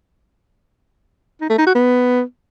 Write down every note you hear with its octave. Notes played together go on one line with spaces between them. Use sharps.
D#4
A3
D#4
F#4
B3